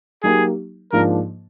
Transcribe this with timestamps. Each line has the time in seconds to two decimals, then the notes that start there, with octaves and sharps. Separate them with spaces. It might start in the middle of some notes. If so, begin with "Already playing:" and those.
0.23 F#3 A#3 D#4 G4 G#4
0.92 G#2 F3 A#3 D4 A#4